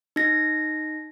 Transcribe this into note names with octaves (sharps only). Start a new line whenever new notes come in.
D#4 A#6